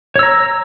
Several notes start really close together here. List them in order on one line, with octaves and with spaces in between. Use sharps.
C#5 E6 A#5